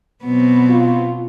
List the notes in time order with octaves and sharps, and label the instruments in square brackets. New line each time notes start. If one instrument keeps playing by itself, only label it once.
[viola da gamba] B2 F#3 [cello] B3 C4
[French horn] F4